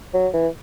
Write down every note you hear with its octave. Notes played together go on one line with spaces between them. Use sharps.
F#3
E3